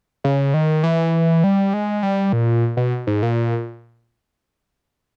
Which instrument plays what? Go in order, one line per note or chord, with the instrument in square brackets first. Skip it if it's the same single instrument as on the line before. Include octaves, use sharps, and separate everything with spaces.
[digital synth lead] C#3
D#3
E3
G3
G#3
G3
A#2
B2
G#2
A#2